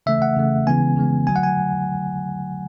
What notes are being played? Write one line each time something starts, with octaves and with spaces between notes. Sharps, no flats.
C#3 E3 A3 E5
F#5
C#3 E3 A3
C#3 E3 G#3 B3 G#5
C#3 E3 G#3 B3
D3 F#3 A3 G#5
F#5
G#5